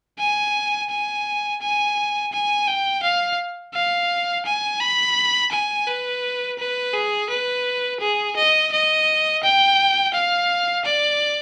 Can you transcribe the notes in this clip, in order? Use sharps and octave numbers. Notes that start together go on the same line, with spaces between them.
G#5
G#5
G#5
G#5
G5
F5
F5
G#5
B5
G#5
B4
B4
G#4
B4
G#4
D#5
D#5
G5
F5
D5